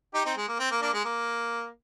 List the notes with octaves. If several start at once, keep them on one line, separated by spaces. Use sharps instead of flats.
D#4 G4
C4 D#4
G#3
A#3
C4
A#3
A#3 D4
G#3
A#3